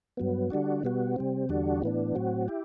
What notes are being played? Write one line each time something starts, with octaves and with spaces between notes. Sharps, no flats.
G2 F#3 B3
D3 G3 D4 F#4
B2 G3 B3 F#4
C3 G3 C4
E2 D3 G3 D4 F#4
A2 E3 B3 D4
A2 F#3 C4 F#4
E4 G4